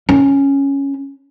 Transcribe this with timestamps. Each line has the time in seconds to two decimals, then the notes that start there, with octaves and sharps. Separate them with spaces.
0.09 C#4